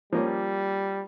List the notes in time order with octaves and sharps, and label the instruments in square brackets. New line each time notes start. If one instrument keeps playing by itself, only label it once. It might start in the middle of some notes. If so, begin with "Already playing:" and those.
[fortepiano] F3 A#3 C#4 [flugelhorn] G3